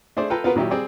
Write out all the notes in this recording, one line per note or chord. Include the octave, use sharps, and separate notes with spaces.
A3 D4 G#4 C5 D5
F4 A4 B4 G5 A#5
B3 F4 F#4 A#4 B4
A#2 D#3 F#3 E4 G4
G3 C4 G#4 D5